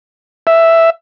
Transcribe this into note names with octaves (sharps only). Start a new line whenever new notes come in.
E5